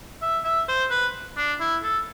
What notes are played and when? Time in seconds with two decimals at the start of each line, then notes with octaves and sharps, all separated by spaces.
0.22 E5
0.44 E5
0.68 C5
0.90 B4
1.37 D4
1.60 E4
1.83 A4